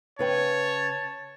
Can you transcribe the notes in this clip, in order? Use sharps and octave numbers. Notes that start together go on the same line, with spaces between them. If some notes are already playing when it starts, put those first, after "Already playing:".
C#3 B4 C#5 G5 A5